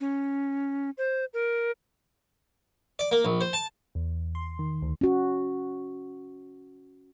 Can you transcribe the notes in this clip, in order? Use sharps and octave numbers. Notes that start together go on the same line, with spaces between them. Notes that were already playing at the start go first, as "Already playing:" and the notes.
C#4
C5
A#4
D5
A#3
A#1
C5
A5
E2
C6
D#3
D2
C#4 F#4